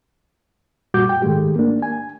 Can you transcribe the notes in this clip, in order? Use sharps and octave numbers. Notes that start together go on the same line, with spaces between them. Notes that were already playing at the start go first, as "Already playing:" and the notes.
F#2 A#2 G3 F#4 D6 G6
G5
G#2 D#3 G#3 A3 G4
A#3 D4
G#5